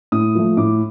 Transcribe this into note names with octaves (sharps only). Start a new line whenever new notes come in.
A2 D#6
F3 A3
A2 D6